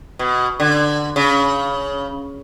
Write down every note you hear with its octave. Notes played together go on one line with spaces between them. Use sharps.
B2
D3
C#3